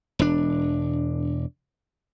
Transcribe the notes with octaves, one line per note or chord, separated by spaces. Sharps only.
E1 D4